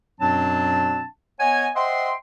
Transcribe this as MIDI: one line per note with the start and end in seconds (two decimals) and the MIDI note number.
0.20 1.04 42
0.20 1.04 47
0.20 1.04 54
0.20 1.04 60
0.20 1.04 62
0.20 1.04 81
1.40 1.69 59
1.40 1.69 73
1.40 1.69 75
1.40 1.69 78
1.40 1.69 80
1.75 2.12 72
1.75 2.12 75
1.75 2.12 76
1.75 2.12 78
1.75 2.12 79
1.75 2.12 84